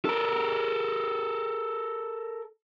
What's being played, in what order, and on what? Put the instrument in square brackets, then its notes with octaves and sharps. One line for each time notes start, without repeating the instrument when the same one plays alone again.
[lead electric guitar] A4 A#4